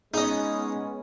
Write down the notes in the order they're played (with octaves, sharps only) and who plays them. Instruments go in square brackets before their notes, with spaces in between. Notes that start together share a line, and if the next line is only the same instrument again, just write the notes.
[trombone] G#3 [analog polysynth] B3 C#4 [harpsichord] D#4 D#5 [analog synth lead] G#4